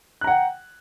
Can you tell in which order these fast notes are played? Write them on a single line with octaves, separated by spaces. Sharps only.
F#6 A#5 F#5 G5